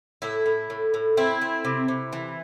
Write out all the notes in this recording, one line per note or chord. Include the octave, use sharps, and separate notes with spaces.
A2 E4
A2
A2
A2
C4 E4
C4
C3
C3
E3